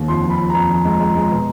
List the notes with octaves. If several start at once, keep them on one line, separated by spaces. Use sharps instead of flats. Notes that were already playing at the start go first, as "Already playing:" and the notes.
Already playing: D#2
F2 C6
F3
B5
F2
F2 A#5
F3
G#3
G#3
G#3
B2